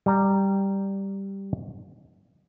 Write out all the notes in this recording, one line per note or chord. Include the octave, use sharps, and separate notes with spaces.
G3 A#5